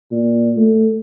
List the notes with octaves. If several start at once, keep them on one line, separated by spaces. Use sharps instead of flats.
A#2
A3